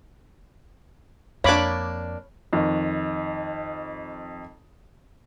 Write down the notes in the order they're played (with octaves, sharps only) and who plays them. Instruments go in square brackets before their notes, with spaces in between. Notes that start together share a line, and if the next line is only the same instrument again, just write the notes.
[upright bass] F2 [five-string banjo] A#3 D4 [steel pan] C#5 B5 D6
[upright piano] F2 D#3